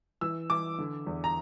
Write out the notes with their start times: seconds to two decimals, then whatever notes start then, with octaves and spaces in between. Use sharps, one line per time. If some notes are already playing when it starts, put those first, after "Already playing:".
0.21 E3 E6
0.50 E3 D6
0.78 D3
1.07 E2
1.24 A#5